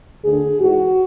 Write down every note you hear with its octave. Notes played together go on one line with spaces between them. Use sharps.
D2 D3 G#4
G#2 E3 F#4